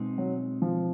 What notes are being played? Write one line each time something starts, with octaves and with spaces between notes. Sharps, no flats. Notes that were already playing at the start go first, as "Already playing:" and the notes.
Already playing: B2 G#3 C4 D#4
F#3
F3